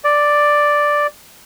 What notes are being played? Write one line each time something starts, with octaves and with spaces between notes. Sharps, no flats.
D5